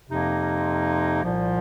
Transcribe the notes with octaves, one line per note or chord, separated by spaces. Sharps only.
F2 C3 F3 A#3 D#4
C2 A#2 F3